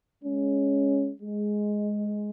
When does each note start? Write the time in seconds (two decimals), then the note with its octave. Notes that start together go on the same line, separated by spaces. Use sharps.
0.24 G#3 C#4
1.22 G#3